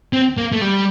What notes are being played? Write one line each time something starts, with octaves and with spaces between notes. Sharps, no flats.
C4
A#3
A3
G3